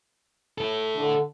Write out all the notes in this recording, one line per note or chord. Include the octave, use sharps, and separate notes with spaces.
E4 A4
D3